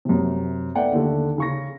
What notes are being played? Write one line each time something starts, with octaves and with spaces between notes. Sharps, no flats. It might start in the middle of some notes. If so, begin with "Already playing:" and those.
F#2 C3
A3 B3 D5 E5 F#5 G5
D#2 D3
C#3 C#6 A#6